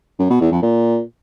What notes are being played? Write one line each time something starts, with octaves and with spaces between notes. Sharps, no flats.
F#2
B2
E2
F2
A#2